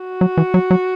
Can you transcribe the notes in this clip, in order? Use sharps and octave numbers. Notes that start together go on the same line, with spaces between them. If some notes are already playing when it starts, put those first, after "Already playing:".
Already playing: F#4
F#3
E3
F#3
F#3